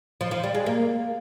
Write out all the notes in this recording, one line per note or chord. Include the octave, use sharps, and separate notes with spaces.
F3
F3
G3
G#3
A#3